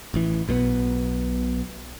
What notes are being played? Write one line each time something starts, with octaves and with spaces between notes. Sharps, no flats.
A1 E3
B1 B2 D3 B3